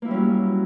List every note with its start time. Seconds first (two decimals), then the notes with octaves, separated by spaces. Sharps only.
0.02 A#3
0.05 E4
0.08 G3
0.11 C#4
0.14 F#3